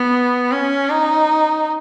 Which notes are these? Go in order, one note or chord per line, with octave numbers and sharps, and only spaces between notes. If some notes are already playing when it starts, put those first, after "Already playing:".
Already playing: B3
C#4
D#4